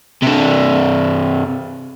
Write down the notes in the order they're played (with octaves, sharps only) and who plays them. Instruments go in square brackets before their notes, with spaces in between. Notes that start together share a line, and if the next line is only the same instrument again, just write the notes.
[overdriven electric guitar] C3 D4